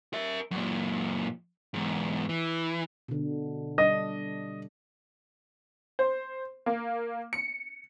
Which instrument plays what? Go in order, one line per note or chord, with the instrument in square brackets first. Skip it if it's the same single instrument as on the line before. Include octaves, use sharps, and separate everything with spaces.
[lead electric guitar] A#4 E5
F#2 A#2
E2 G#2
E3
[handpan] B2 D3
[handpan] G3 D4 [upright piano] D#5
[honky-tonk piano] C5
A#3
C#7